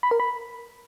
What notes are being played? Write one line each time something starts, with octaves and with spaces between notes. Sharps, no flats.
B5
A#4
B5